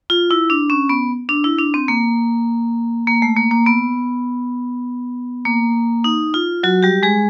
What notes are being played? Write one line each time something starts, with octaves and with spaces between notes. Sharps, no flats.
F4
E4
D4
C#4
B3
D4
E4
D4
C4
A#3
A#3
A3
A#3
A#3
B3
A#3
D#4
F4
F#3 F#4
G3 G4
G#3 G#4